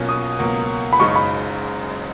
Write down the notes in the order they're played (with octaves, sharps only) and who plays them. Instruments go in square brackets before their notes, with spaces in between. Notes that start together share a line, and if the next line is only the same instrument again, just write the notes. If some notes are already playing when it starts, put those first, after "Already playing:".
Already playing: [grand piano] B1 B2 A#3 C#4 F4
[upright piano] D#6
[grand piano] C#2 B2 F#3 A#3
[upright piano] B5
[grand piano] F#1 F#2 C#3 G#3 D#4 [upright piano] C#6
[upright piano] B5